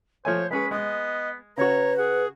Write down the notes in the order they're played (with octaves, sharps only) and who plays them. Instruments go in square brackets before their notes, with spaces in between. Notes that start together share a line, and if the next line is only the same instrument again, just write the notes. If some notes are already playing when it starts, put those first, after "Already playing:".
[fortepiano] F3 A3 G#5 [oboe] C5 [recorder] C#5
[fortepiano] G#3 C#4 G#4 [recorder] B4 [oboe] B5
[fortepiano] G#3 [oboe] B3 [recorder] D#5
[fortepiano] C#3 F#4 [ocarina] B4 [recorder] C#5 [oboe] A#5
[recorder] G#4 [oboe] F#5